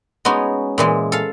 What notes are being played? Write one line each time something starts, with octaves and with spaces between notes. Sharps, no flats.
G#3 B3 C#4 D#4 F#4
A#2 E3 G#3
A4 F5